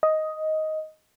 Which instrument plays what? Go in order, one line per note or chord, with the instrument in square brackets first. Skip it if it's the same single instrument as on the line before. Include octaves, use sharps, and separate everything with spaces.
[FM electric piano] D#5